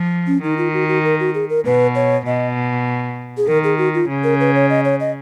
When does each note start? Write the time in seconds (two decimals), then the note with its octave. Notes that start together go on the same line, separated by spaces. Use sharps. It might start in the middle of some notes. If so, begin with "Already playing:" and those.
Already playing: F3
0.27 C#4
0.43 D#3 D#4
0.58 F4
0.74 F#4
0.88 F#4
1.04 A#4
1.20 F#4
1.34 G#4
1.50 A#4
1.65 B2 B4
1.95 C#5
2.26 B2 D#5
3.37 G#4
3.48 D#3 A#4
3.64 G#4
3.78 F#4
3.94 F4
4.09 C#3
4.24 A#4
4.40 B4
4.55 C#5
4.70 D#5
4.85 C#5
5.00 D#5